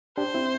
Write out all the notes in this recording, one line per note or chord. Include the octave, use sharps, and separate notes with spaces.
D4 G4 C5
C4 E4